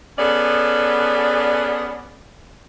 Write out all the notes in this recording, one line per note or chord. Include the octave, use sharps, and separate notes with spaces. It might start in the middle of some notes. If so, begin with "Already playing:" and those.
B3 C#4 G#4 A4 D5